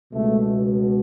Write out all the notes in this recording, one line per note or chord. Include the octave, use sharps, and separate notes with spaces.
C#2 B2 A3